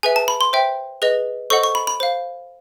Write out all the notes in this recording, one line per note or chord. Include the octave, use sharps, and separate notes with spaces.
G#4 B4 E5 G#5
A5
B5
C6
C5 E5 G5
G#4 B4 D#5
A4 C5 D#5 F#5 C#6
C#6
B5
B5
C5 F5